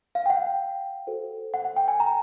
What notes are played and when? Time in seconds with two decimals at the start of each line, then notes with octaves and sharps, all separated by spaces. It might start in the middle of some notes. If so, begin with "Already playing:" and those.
0.15 F5
0.26 G5
0.30 F#5
0.46 G5
1.07 F#4 A4 C5
1.54 F#5
1.65 F#5
1.77 G5
1.88 G#5
2.00 A#5